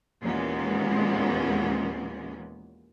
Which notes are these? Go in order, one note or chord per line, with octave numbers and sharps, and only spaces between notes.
D#2 A#2 E3 G#3 B3 C#4